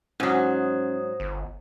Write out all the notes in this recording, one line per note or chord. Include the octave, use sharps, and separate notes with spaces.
G#2 F#3 C#4 C5 D#6
G1